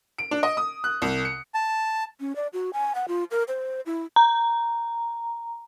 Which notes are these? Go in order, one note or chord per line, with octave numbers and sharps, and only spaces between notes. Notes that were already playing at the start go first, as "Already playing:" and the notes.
D7
D4
D#5
D#6
F#6
C2
C#7
A5
C#4
D5
F#4
G#5
F#5
F4
A#4
C5
E4
A#5